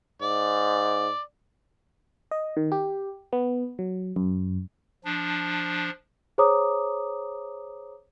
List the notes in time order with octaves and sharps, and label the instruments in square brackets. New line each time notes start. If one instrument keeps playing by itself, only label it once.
[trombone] G#2 [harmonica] D5
[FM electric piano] D#5
D#3
G4
B3
F#3
F#2
[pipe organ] F3 D4
[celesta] G#4 C5 C#5 A#5 D6 D#6